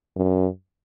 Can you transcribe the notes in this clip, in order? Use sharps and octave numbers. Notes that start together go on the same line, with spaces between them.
F#2